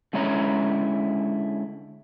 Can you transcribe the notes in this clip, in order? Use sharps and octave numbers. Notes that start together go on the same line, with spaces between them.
D3 G#3 C#4 E4 C#5 A#5